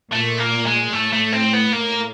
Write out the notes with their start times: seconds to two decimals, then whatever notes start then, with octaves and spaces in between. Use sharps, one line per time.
0.12 A#2 A3
0.39 A#3
0.67 G#3
0.93 A2 A3
1.13 A3
1.32 C4
1.53 B3
1.73 A2 A#3